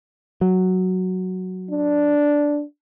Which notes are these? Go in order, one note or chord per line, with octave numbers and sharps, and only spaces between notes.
F#3
D4